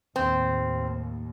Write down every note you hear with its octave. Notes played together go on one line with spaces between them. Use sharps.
D#2 A2 C4